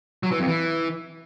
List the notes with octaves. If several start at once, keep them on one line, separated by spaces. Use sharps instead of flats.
F#3
E3
F2
E3